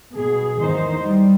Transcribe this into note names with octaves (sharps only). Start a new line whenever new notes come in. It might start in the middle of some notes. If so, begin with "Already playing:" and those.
B2 G#4
E2 D#3 D#4 C5
G3